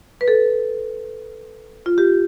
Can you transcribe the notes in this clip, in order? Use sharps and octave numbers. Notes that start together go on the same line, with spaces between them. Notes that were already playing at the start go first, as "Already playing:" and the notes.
B4
A4
F4
G4